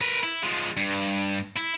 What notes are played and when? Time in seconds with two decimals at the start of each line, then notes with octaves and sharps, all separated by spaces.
0.01 A#4 B4
0.23 E4
0.43 F3 G#3
0.77 G2
1.56 E4